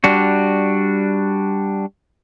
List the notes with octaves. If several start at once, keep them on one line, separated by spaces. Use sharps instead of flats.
G3 D4 F#4